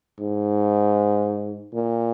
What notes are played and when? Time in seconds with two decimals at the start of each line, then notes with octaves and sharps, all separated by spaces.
0.20 G#2
1.74 A#2